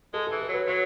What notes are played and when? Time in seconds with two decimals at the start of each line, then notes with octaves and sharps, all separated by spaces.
0.14 G#3 A4
0.27 E3 A4
0.41 A4
0.49 F#3 B4
0.67 F#3 C#5